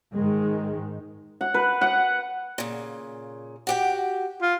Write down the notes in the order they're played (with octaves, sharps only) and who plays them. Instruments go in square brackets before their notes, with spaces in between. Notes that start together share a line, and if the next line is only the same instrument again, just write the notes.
[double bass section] G#2 D#3 G#3
[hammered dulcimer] F#5
B4
F#5
[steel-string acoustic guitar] A#2 C#3
F#4 G4 G5
[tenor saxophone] F4